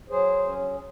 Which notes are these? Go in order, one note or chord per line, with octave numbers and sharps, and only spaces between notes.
F#3 G#4 C5
C#4